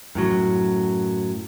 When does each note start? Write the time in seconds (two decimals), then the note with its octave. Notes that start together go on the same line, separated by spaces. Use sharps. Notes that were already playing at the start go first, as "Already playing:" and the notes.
0.15 F#2 A2 F#3